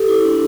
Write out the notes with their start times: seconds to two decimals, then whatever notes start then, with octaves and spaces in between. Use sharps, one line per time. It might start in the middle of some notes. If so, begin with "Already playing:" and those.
Already playing: G4 A4
0.08 E4
0.25 D4